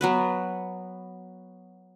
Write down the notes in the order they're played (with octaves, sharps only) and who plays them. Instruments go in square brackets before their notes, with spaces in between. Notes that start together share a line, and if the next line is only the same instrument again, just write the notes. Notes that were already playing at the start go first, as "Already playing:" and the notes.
[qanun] F#3 B3 B4